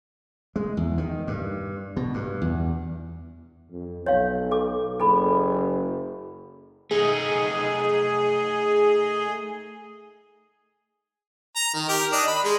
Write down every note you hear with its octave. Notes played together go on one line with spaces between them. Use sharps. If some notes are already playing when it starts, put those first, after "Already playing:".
G#3
E2
D#3
G2
B2
G2
E2
F2
B1 C#5 F5
A4 D6
F#1 A4 B5
A3 D#4 G#4
A#5
D#3
G4 A#4
D4 D5 D#5
B5
G#3